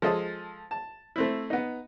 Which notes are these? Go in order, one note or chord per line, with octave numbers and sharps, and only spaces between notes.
F3 G#3 A4 D#5
A5
A3 C4 E4
B3 D#4